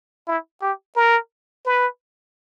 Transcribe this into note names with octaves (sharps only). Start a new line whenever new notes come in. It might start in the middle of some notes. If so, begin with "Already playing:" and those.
E4
G4
A#4
B4